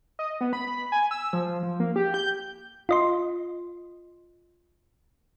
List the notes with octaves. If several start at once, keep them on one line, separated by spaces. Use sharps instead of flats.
D#5
B3
B5
G#5
E6
F3
F3
A#3
G4
G6
F4 D#5 C6